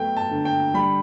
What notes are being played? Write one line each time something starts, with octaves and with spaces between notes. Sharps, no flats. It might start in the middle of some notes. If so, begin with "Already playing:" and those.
Already playing: F#3 A3 B3 G5
A5
D3
G5
G3 B5